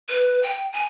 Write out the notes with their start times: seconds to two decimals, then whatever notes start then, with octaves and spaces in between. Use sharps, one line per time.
0.09 B4
0.43 G5
0.73 G#5